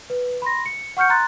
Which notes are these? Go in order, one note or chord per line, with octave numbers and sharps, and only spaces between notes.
B4
B5 C6 A#6
C#7
F#5 C#6 F6 G6 C#7
A#5 C6 F#6 A6